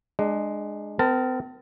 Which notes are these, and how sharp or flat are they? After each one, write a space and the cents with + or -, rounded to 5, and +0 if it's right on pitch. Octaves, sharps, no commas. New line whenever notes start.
G#3 +0 D4 +25
C4 -40 A#4 -10 A5 +20